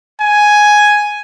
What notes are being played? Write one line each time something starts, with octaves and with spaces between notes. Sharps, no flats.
G#5